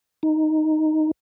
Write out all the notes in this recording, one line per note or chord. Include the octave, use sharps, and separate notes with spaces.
D#4